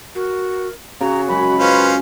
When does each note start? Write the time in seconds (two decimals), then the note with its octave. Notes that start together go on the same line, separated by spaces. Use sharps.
0.15 F#4 A#4
1.01 C#3 F#4 A#5
1.28 F#2 G#3 B5
1.59 C#4 F4 B4 C5